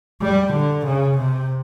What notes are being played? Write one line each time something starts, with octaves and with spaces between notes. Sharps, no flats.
G3
D3
C#3
C3